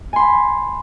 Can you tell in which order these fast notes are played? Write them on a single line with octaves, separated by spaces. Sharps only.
G#5 C6 B5